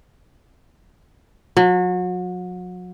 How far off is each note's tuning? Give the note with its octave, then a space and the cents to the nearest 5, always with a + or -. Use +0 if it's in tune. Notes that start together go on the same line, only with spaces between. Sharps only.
F#3 -35